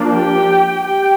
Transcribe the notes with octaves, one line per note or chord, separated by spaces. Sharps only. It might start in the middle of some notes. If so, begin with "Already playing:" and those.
Already playing: F3 A#3 D4
G4 G5
G4 G5